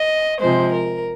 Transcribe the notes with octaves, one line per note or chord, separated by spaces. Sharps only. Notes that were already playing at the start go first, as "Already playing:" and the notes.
Already playing: D#5
C3 F3 G#3 C5
A#4